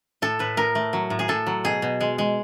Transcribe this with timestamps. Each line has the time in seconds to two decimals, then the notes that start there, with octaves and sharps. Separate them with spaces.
0.22 A2 A4
0.39 A2 B4
0.57 A2 A#4
0.75 A3
0.93 F#3
1.10 A2
1.19 G#4
1.28 A2 A4
1.47 F#3
1.64 B2 G#4
1.82 B2
2.01 G#3
2.18 G#3